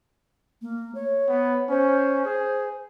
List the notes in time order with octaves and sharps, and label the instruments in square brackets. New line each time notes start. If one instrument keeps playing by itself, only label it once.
[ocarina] A#3
C#5
[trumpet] B3
[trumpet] C#4 [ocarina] C5
[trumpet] G#4